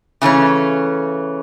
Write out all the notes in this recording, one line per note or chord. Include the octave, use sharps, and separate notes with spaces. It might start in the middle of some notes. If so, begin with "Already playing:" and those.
C#3 E3 A3 C#4